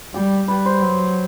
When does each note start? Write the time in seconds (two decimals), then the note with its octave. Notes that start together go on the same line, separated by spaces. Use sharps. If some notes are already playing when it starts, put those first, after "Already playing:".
0.14 G3 G4
0.48 G3 B4
0.66 C5
0.82 F#3